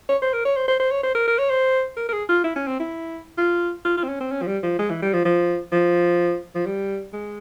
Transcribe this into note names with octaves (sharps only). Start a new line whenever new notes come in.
C#5
C5
A#4
C#5
C5
C5
C5
C#5
C5
A#4
A#4
C#5
C5
A#4
A#4
G#4
F4
E4
C#4
C4
E4
F4
F4
F4
C4
C#4
C4
C#4
F3
G3
F3
G#3
E3
G3
F3
F3
F3
F3
G3
G#3